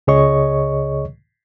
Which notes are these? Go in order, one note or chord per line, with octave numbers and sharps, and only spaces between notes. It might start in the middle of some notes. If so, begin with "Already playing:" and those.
C#2 C#3 G#4 C#5 D#5 C#6